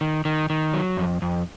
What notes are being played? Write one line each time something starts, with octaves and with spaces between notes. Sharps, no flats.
D#3
D#3
D#3
F#3
F2
F2